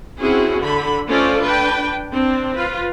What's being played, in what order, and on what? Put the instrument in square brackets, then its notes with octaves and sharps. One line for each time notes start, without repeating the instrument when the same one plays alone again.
[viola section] C4 C#4 E4 F#4 G#4
D3 B5
A3 C#4 F4 A4 C5 D5
D4 B4 G5
C4 D4
F4 B4